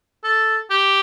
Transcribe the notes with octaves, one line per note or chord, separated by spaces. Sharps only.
A4
G4